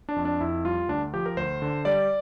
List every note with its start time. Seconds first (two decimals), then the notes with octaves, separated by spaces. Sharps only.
0.09 D4
0.16 F2
0.25 D4
0.41 F2 E4
0.65 G3 F4
0.89 D2 D4
1.13 F3 G4
1.26 A#4
1.37 D2 C5
1.62 D3
1.85 G3 D5